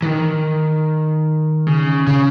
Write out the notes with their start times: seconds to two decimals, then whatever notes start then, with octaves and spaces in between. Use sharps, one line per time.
0.02 E3
0.06 D#3
1.67 C#3
2.07 C#3